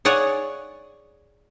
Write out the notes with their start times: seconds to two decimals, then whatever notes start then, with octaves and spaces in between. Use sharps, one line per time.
0.05 G#4 C#5 D5 F#5 G#5